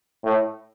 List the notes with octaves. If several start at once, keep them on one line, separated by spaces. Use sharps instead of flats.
A2